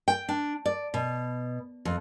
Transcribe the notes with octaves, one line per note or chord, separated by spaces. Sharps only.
G5
D4
D5
B2
F2